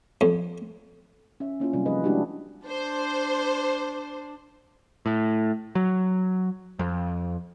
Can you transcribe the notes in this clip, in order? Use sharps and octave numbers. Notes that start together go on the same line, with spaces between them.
F2
C#4 E5
A#3 C#4 E4 F4
C3 F#3 G3 F4
F3 D#4 G#4 B4 D#5
G#3 A3 D4 E4 F#4 G4
D4 C5
A2
F#3
F2